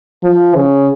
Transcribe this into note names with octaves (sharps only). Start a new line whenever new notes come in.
F3
C#3